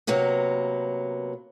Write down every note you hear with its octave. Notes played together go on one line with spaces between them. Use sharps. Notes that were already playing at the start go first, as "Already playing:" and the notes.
C3 F#3 A#3 B3